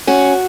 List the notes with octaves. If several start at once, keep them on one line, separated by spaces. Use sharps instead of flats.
C#4 F#4